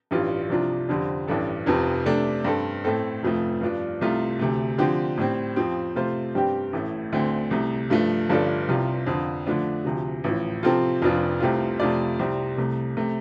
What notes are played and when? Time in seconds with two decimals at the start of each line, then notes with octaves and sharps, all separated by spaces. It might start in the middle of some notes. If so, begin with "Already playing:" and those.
0.11 A1 G2 G3 F4
0.49 C2 C3 F3 D4 F4
0.89 F2 D3 G3 C4
1.27 A1 G2 G3 D4 A4
1.66 F1 F2 C3 F3 C4
2.05 C3 A3 D4 A4
2.44 G2 G3 C4 A4
2.84 A2 A3 C4 A4
3.23 F1 F2 F3 A3
3.61 G2 F3 D4
4.01 C2 C3 A3 F4
4.39 D2 C3 A3
4.78 D3 F3 C4 G4
5.17 A2 G3 C4
5.56 F2 F3 C4 G4
5.96 C3 A3 F4 C5
6.35 G2 G3 C4 G4
6.73 A1 A2 A3
7.12 D2 D3 A3 C4
7.51 C2 C3 A3
7.90 G2 F3 A3
8.29 G1 G2 F3 D4 A4
8.68 C2 C3 G3 F4
9.06 F2 D3 F3
9.46 D3 F3 A3 D4
9.85 D2 C3 F3
10.24 A1 A2 F3
10.63 C3 F3 C4 F4 A4
11.02 F1 F2 F3 D4 F4
11.40 C2 C3 A3 C4 F4
11.80 F2 C3 A3 F4 D5
12.18 C2 C3 G3 C4 G4
12.57 C2 C3 A3
12.97 C3 A3